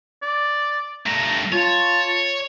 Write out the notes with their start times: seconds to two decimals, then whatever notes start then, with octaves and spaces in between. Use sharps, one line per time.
0.22 D5
1.06 G2 A3 A#5
1.52 F4 C#5 A5